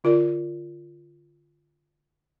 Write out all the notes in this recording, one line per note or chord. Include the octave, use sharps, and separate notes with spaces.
D3 F4 A#4 D5